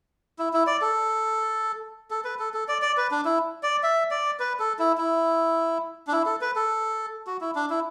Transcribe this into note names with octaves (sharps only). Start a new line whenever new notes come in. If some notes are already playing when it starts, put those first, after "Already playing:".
E4
E4
D5
A4
A4
B4
A4
A4
D5
D5
B4
D4
E4
D5
E5
D5
B4
A4
E4
E4
D4
E4
A4
B4
A4
F#4
E4
D4
E4